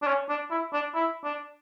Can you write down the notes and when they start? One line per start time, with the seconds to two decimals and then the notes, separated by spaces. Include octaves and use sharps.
0.02 D4
0.07 C#4
0.29 D4
0.51 E4
0.73 D4
0.95 E4
1.24 D4